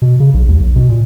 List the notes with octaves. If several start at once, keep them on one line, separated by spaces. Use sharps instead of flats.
B2
C#3
B1
D#2
B1
B2
A#2